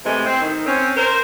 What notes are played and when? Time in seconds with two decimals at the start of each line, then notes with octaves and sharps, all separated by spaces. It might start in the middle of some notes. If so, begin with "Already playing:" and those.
0.04 C3 E3 G#3 A3
0.26 C4
0.41 D#3
0.66 C4 C#4
0.96 A#4 C5